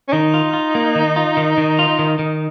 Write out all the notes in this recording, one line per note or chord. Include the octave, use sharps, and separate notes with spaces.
C#4
D#3 D#4
F4
F4
A#3
D#3
F4
D#3
D#3
F4
D#3
D#3